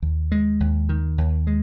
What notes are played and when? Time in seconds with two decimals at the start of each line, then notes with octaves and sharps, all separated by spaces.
0.02 D#2
0.32 G#3
0.60 D#2
0.89 D#3
1.18 D#2
1.47 G#3